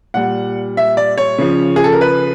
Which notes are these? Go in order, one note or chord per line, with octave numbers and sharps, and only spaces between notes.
A#2 G3 F#5
E5
D5
C#5
C#3 F3
G#4
A4
A#4
B4